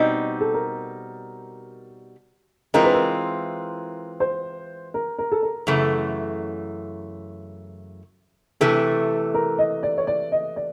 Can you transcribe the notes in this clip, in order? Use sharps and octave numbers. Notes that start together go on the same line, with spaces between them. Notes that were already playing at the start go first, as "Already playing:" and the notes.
Already playing: B2 G3 C4 D#4 C5
A4
A#4
E3 G#3 C4 F4 A#4
B4
A#4
C5
A#4
A#4
A4
A#4
F#2 C#3 E3 A3
C3 E3 A3 A4
A#4
D#5
D5
C#5
D5
D#5
D5